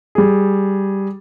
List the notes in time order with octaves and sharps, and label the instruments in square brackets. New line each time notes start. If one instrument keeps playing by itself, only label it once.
[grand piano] G3 G#4